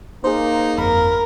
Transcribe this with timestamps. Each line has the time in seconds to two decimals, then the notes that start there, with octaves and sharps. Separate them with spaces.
0.24 A#3 D#4 G#4 C5
0.78 G1 F2 A#4 B5